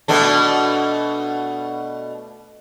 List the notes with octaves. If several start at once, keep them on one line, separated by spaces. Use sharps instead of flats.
B2 A3 D4